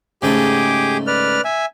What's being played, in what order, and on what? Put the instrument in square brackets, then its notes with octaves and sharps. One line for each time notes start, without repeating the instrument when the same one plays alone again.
[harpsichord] G#2 C#3 A3 [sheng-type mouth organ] G4 G#4 D6
[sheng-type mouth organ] B4 D5 F6
E5 G#5